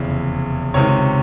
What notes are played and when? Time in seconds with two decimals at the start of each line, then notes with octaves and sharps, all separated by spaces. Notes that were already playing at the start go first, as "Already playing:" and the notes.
Already playing: F1 E2 C#3 E3
0.74 C#2 C3 D#3 C#5